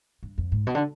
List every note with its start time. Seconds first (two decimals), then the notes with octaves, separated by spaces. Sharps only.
0.23 G2
0.38 F2
0.52 G#2
0.67 B2
0.75 D3